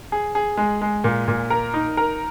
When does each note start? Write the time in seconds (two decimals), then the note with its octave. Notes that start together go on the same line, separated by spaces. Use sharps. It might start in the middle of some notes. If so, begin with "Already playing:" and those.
0.12 G#4
0.35 G#4
0.57 G#3
0.82 G#3
1.04 A#2
1.28 A#2
1.50 A#4
1.74 D#4
1.97 A#4